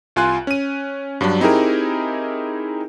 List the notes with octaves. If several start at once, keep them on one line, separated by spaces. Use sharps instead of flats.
C2 F4 G#5 C6 F#6
C#4 D#7
G2 F#3 G3 D4
C4 D#4 E4 G4 G#4 A#4